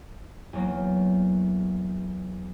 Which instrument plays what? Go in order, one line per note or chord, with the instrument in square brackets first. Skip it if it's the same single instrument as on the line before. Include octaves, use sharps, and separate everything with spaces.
[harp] E2 F#3 A#3